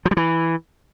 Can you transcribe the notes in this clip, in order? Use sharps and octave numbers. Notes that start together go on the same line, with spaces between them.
F3
G3
E3